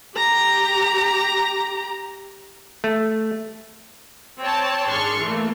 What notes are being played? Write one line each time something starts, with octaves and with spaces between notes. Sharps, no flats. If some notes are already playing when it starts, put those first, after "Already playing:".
G4 A#5
A3
C4 C#5 G5 A5
G#1 D4 G#4 C6 C#6 F6
E3 A3 A#3